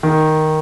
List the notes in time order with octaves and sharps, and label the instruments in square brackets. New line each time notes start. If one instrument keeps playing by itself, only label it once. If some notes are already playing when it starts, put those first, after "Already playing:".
[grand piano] D#3